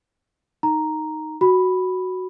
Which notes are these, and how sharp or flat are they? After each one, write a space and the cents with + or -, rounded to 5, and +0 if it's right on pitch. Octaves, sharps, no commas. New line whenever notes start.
D#4 +0 A#5 +0
F#4 +0 B5 +0